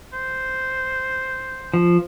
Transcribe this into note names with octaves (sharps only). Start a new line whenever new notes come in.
C5
F3